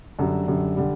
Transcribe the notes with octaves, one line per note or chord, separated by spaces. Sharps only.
F#2 D3 G3
F#2 D3 G3
D3 G3